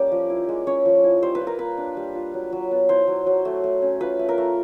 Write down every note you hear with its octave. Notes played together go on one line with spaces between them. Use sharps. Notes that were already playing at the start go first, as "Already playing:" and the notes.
Already playing: G3 A#3 C#4 D5
F3
E4
G#3
C#4 C#5
F3
E4
G3 C5
B4
F4
A#4
A#3 B4
D4
G3
F4
F#3
F#3
B3
E4 C5
F#3
F#3
A3
A3
C#4
F4 B4
A3
A#4
A3